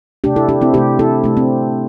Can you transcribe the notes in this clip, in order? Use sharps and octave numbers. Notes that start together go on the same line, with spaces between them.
C3 A3 D4 G4
E4 A4
D4 G4
C4 E4
C3 A3 D4 G4
E4 A4
C3 A3 D4
C4